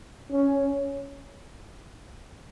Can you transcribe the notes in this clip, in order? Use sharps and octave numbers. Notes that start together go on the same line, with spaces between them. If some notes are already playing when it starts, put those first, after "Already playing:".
C#4